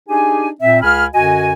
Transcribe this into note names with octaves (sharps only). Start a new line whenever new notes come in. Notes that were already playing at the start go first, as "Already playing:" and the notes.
D4 D#4 G4 G#4 G#5
A#2 C4 E5
C#2 G#4 F5 G#5 B5 F6
F#2 D3 F#4 D#5 G#5